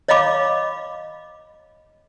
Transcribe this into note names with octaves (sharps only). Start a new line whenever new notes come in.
C#5 D#5 F5 B5 D6